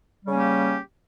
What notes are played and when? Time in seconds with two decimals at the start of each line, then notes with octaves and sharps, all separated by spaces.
0.25 G3
0.28 C#3
0.31 C#4
0.34 A#3
0.37 G4